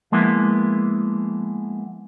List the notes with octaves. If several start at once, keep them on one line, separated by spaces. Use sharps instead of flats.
F3 G#3 A#3 B3 E4